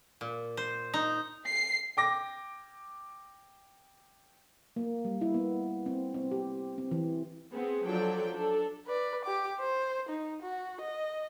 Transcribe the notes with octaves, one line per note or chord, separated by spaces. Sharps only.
A#2
C5
D#4
C7
G5 D6 A#6
A#3
G3
E4
B3
C4
C4
G4
C4
E3
B3 C4 G#4
F3 F#3 D4 A4 D5 G5
D4 A4
B4 D5
G4 D6
C5
D#4
F#4
D#5